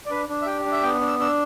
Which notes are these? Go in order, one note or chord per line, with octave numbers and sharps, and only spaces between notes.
D5
D4 B4
D4
E5
G4 G5
D4
E5
B3 G5
D4
E6
D4 E6